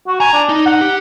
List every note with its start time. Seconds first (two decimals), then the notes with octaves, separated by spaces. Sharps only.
0.08 F#4
0.20 G#5 A#5
0.33 D4
0.49 D#4
0.66 F#5
0.81 G4